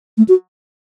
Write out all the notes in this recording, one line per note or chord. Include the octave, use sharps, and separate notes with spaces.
A3
F#4